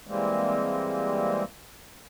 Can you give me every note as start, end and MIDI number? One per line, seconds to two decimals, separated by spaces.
0.07 1.43 52
0.07 1.43 55
0.07 1.43 56
0.07 1.43 58
0.07 1.43 60